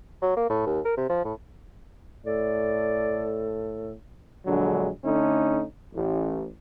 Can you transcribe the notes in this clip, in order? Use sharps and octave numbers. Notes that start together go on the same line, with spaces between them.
F#3
A#3
A2
D#2
A#4
C3
F3
A2
A2 A4 D5
A#1 D3 F#3 G#3
D3 A3 C#4 D#4
A1